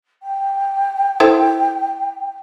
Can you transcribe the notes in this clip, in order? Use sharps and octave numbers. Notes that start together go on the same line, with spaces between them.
G5
E4 A4 C5